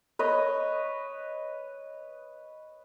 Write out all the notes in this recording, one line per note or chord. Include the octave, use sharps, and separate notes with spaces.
B4 C#5 D#5